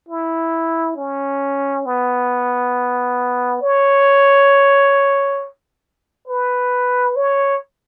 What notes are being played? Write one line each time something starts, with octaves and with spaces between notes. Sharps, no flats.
E4
C#4
B3
C#5
B4
C#5